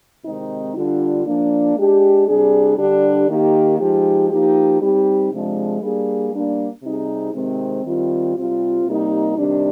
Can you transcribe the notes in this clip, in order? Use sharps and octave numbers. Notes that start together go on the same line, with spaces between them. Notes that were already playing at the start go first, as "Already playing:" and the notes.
C3 D#3 G#3 C4 D#4
D3 G3 D4 F4
F3 A#3 D4
G#3 D4 G4
C3 G3 D4 G#4
D3 G3 D4 G4
D#3 A#3 D#4 G4
F3 G#3 D#4 G4
F3 A#3 D#4 G4
G3 C4 D#4 G4
C3 F3 G#3 D4
G3 A#3 D4 G#4
G3 A#3 D4
C3 G3 C4 D#4 G#4
C3 D#3 G#3 C4
D#3 G3 C4 F4
C3 G3 C4 F4
C3 G3 A#3 D#4
C3 D#3 G3 D4